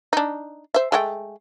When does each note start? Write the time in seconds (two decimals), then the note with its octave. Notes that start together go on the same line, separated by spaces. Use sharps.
0.13 D4 D#4
0.74 C5 E5
0.92 G#3 A3 G5